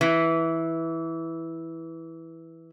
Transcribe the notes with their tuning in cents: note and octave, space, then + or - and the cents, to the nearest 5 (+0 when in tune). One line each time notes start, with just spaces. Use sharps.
E3 -10